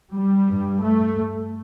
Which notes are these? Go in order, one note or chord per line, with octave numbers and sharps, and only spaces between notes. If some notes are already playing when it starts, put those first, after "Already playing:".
G3
G2
A3